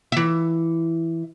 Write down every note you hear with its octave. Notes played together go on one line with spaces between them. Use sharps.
E3 E5